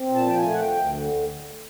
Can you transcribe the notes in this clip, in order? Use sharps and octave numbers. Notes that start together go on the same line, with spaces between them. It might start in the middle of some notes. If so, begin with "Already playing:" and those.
Already playing: C4
A#2
A5
F3 G5
G#5
A3
F#5
D2 G5
D2
D3